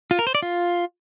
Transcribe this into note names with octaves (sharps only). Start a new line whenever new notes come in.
F4
A#4
C5
D5
F4